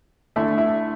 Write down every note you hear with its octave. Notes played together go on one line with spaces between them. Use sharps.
D3 A3 E4
E4